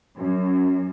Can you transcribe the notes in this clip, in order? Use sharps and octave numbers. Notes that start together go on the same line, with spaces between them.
F#2